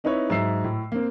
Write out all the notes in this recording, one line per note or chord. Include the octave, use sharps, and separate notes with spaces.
C4 D#4 E4 B4 C#5
G#2 F#3 E5 E6 C7
A2
A#3 C4